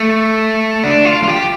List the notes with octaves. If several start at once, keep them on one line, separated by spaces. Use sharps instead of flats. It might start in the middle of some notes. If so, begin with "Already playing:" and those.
Already playing: A3
D4
F4
F4
G4